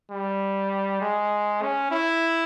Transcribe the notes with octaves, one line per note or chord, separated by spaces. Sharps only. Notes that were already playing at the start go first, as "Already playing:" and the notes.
G3
G#3
C#4
E4